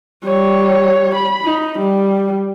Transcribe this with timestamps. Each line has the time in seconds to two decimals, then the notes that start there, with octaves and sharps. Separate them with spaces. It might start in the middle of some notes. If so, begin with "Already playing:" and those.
0.24 G3 C#5
1.14 B5
1.45 D#4
1.79 G3